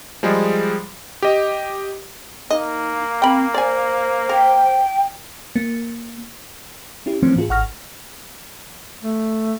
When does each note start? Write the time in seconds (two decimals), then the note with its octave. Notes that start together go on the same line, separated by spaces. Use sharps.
0.23 F3 G3 G#3 G#4
1.22 G4 D#5
2.50 A#3 D#4 D#5
3.22 C4 G5 B5
3.54 C5 D5 G#5
4.29 A#4 G5
5.56 A#3
7.06 C#4 E4 G4
7.22 E3 F3 A3 A#3 C4 C#4
7.36 A2 F4 G#4
7.49 G#1 F#5 C#6 F6 A#6
9.03 A3